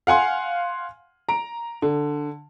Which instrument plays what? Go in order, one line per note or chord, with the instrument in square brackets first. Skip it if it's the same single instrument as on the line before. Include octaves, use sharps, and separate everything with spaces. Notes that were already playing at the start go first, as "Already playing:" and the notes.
[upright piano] F5 F#5 G#5 C6
A#5 D7
D3